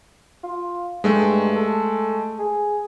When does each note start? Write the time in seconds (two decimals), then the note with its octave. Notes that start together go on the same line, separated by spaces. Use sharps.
0.44 F4
1.04 G2 G#3 A3
1.56 A4
2.39 G#4